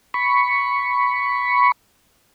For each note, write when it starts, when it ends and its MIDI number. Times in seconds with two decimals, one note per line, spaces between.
0.14 1.72 83
0.14 1.72 85